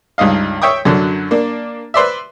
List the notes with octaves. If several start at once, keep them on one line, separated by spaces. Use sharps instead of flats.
C#2 G2 D#4 D#5 F5
C#5 E5 G5 C#6 D#6
F#2 D3 F#3
A#3 D4
B4 C5 D5 E5